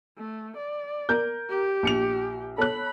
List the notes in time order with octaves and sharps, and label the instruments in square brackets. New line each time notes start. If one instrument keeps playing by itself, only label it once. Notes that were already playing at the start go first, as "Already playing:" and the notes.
[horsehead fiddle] A3
D5
[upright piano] A#4 G6
[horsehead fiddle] G4
[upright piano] A#1 C#7 F7
[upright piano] A4 C#5 F#6 [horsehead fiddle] B5